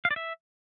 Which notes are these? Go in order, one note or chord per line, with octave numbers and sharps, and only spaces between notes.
F5
D5
E5